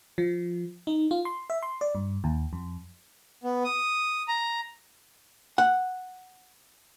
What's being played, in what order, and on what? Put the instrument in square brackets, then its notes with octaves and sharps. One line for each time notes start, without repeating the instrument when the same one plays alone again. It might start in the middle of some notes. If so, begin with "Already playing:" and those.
[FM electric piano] F3
D#4
F4
C6
E5
C6
D5
G2
D#2
F2
[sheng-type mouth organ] B3
D#6
A#5
[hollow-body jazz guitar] F#5